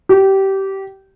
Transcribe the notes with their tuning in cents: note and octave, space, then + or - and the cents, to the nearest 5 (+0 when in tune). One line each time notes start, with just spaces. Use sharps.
G4 -20